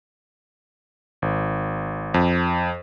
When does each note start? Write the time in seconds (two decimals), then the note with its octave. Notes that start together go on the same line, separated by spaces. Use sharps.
1.22 G#1
2.14 F2